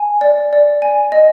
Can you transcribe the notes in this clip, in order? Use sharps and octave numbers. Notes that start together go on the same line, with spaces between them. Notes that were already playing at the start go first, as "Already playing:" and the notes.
Already playing: G#5
D5
D5
G#5
D#5